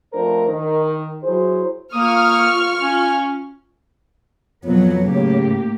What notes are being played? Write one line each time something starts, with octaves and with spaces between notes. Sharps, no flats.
F2 A3 D4 A#4 C5
D#3
F#3 E4 G#4 C5
A#3 F4 C#6 D#6 F6
C#4
F2 B2 F#3 B3 C#5
A2 C#3 A#3 G4